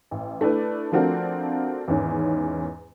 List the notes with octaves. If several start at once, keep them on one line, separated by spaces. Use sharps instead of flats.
A1
A3 D4 E4 B4
F3 A3 C4 D4 F#4 A#4
E2 G#2 D#3 C#4